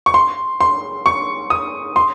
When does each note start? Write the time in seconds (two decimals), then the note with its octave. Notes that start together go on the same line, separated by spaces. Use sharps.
0.06 C#6
0.14 C6
0.61 C6
1.06 C#6
1.50 D#6
1.96 C6